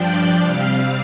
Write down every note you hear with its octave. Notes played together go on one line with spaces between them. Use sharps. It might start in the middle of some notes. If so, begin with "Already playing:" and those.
Already playing: G2 F3 D4 D5 G5
C3 G3 C4 F5